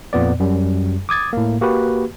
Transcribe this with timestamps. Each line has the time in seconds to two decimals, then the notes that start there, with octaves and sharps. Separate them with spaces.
0.13 F2 A#2 B3 D5
0.40 F#2 G3
1.09 D6 D#6 G#6 A6
1.33 A2 A#3
1.61 A#3 F#4 G4 B4